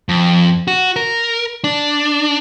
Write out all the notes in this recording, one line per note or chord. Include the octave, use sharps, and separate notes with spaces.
F2
F#4
A#4
D4